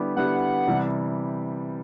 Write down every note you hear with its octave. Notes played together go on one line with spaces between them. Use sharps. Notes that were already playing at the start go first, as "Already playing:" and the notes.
Already playing: D3 G3 B3 E4 G4
D3 G3 B3 E4 G4 F#5
C3 E3 G3